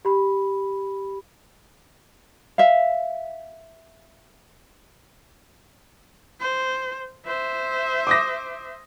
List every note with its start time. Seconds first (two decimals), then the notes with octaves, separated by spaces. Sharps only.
0.05 G4 B5
2.58 E5 F5
6.40 C5
7.25 C5 E5
8.07 D6 D#6 A#6